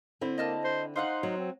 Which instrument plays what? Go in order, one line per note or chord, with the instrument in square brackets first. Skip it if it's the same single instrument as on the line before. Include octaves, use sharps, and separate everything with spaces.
[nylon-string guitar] D3 C4 E4
[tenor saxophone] A#3 [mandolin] D#5 A5 F6
[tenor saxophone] C5
[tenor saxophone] D#4 [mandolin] C5 F5 F#5
[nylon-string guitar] F#3
[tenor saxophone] C4